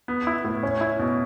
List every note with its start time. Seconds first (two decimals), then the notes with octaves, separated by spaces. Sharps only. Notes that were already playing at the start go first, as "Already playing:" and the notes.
0.08 B3
0.27 E4
0.45 A2
0.63 C#4
0.81 E4
0.99 B2